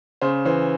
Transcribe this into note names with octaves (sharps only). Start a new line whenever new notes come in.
C#3 C5
E3 C5